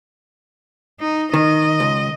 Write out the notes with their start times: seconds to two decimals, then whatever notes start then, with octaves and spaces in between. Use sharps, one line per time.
1.00 D#4
1.34 D#3 D#5
1.80 C#2